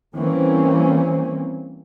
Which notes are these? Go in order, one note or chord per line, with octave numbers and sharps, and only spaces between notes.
E3 G3 A#3 C4 C#4